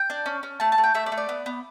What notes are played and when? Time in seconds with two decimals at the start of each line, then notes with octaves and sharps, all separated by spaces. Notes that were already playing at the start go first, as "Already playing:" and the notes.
Already playing: G5
0.10 D4
0.26 C#4
0.43 C#4
0.60 A3 A5
0.72 A5
0.78 A3
0.84 G5
0.94 A3 E5
1.06 D5
1.12 A3
1.18 D5
1.29 B3
1.46 B3